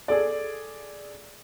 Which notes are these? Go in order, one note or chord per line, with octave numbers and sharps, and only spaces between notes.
G#4 A4 D5